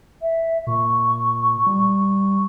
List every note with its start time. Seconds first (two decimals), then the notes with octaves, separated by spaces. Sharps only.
0.21 E5
0.67 A#2 C#6
1.66 G3